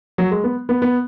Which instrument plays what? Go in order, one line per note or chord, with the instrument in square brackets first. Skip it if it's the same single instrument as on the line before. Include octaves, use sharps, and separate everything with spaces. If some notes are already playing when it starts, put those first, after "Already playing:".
[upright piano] F#3
G#3
B3
B3
B3